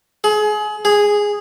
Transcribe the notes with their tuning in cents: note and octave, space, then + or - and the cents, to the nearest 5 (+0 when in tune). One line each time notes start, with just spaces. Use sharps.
G#4 +30
G#4 -5